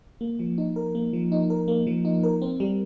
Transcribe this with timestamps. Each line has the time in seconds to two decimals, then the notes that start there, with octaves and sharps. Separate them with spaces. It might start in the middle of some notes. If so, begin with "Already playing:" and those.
0.21 A#3
0.39 F3
0.58 D#4
0.76 A#4
0.95 A#3
1.13 F3
1.32 D#4
1.50 A#4
1.68 A#3
1.87 F3
2.05 D#4
2.23 A#4
2.42 C4
2.60 G3